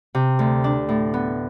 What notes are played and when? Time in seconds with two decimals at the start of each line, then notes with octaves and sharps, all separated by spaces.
0.15 C3
0.39 D2
0.64 D4
0.89 A2
1.14 B3